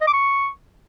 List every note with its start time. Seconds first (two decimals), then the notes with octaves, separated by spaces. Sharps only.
0.01 D#5
0.07 D6
0.13 C#6